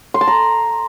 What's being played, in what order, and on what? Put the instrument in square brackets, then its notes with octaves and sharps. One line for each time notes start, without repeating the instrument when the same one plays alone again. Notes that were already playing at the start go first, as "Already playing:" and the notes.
[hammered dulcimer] C6
A5
A#5